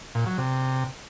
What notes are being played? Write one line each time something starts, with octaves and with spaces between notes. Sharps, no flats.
A#2
F#3
C3